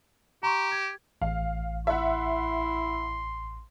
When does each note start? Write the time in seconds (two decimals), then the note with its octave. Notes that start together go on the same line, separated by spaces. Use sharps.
0.43 G4 A#5 C6 C#6
0.72 G#6
1.22 A1 F5
1.87 E4 E5 F#5 C6